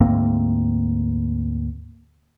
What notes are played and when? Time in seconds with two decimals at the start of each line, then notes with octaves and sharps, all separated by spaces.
0.01 D2 G#2 A#3 C4